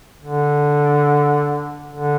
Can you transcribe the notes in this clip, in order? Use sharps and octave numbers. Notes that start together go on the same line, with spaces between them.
D3
D3